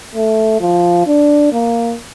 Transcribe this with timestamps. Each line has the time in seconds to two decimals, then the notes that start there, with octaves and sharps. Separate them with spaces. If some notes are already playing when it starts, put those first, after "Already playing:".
0.15 A3
0.61 F3
1.07 D4
1.53 A#3